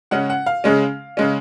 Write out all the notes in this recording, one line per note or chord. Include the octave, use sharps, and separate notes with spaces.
C#3 G#3 C#4 F#5
F#5
F5
C#3 G#3 C#4
C#3 G#3 C#4